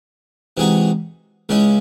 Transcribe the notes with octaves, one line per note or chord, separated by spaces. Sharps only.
C3 E3 G#3 D#4 F#4
C#2 C#3 G#3 C#4 E4